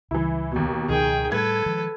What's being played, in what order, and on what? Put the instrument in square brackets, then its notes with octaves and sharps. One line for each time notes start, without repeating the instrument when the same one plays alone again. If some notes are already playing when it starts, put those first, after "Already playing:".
[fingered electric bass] C#2 C#3 G3 [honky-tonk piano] E3 E4
[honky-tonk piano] D#2 B2
[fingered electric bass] C#2 B2 F3 [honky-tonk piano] D#3 [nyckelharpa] G#4 G5
[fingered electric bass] A2 G3 A3 [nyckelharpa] A4 B4 [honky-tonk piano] G#6
[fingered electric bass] D#3 F3 G#3